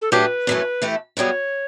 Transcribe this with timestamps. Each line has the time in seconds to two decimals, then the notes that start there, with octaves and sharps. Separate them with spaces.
0.02 A4
0.12 A2 F#3 A3 D4 G4 B4
0.47 F#2 E3 A3 C#4
0.82 E3 A3 E4 G4
1.17 F#2 C#3 G3 B3 F#4 C#5